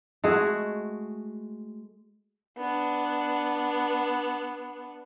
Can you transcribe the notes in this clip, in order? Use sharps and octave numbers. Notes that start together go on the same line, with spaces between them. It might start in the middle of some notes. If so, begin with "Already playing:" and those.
G#3 A3 F#4 G#4
B3 D4